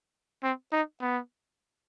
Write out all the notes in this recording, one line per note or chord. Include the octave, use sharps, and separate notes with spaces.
C4
D#4
B3